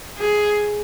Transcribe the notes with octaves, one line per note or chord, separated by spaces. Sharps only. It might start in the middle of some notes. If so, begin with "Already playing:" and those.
G#4